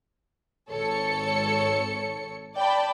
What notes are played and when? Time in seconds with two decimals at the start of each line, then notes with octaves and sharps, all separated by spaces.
0.69 G#1 A4 C#5 C#7
2.56 D5 G5 A5 B5